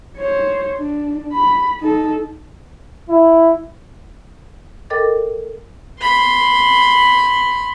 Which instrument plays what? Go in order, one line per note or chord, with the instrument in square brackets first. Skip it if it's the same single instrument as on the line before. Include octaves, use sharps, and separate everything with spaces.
[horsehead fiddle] C5 C#5
D4
B5
D#4 A4
[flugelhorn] E4
[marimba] A4 A#4 D#5 G5 D6 A6
[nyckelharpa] B5 C6